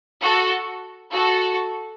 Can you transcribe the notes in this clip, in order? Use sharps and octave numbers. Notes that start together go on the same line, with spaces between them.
F#4 A4
F#4 A4